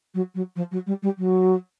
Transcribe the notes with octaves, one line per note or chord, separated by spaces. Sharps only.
F#3
F#3
F3
F#3
G3
G3
F#3